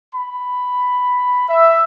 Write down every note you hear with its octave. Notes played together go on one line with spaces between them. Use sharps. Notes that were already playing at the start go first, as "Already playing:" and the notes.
B5
E5